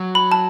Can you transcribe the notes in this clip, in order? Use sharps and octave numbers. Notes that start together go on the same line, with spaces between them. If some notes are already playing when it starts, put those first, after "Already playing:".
Already playing: F#3
B5
A5